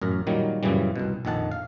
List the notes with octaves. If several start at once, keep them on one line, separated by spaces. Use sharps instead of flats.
A1 F#2 A#4
A#2 D#3 F#3 G3 A#3
F#2 A#2 C#3 E3 G3
C2 B2
A#1 F2 D#3 F#5 A5
F5